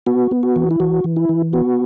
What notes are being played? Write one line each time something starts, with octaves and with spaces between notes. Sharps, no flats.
B3 F#4
B3
F#4
E3
E4
E3 F#4
E3
E4
E3
B3 F#4